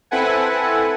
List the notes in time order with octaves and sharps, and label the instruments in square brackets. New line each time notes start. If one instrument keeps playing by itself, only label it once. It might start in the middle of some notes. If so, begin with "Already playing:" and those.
[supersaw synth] C4 E4 A4 B4 F#5 G#5